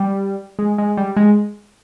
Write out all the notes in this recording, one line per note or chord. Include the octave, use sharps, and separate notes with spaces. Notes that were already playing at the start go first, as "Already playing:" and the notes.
Already playing: G3
G#3
G#3
G3
G#3